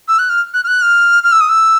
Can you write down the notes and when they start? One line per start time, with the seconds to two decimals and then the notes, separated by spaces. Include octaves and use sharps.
0.08 E6
0.19 F#6
0.30 F6
0.54 F#6
0.64 F6
0.68 F#6
0.82 F6
1.24 F6
1.32 E6
1.41 D#6
1.49 E6